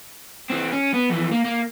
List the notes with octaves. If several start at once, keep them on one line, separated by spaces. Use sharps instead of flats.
E3 C4
C#4
B3
F2 E3
A#3
A#3